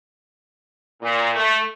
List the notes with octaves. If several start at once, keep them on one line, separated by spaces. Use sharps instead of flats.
A#2
A3